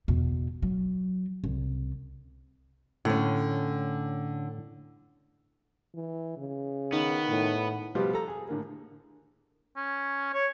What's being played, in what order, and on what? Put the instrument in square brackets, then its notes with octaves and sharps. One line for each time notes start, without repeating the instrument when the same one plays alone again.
[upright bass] E2 B2
F#3
C2
[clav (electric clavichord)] A2 [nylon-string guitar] D3 C#4
[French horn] E3
C#3
[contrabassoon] D#3 [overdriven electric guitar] B3
[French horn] A2
[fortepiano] B2 F3 G3 F4 G4 B4
A4 A#5
G#4
A2 D3 A#3
[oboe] C#4
C#5